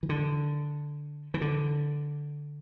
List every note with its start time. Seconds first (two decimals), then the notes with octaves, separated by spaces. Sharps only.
0.03 E3
0.09 D3
1.34 E3
1.41 D3